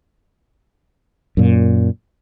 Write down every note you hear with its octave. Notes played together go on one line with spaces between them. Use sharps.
F#2 A#2